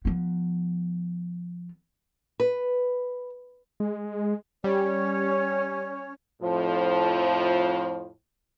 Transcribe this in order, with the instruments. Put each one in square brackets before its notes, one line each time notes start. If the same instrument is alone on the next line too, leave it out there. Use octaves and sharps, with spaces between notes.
[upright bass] F3 B3
[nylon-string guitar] B4
[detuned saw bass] G#3
[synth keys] G3 [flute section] C#4 C#5
[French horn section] F2 A2 F3